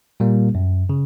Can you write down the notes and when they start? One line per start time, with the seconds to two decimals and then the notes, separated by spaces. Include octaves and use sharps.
0.20 A#2 G3 A#3
0.55 F#2
0.89 C#3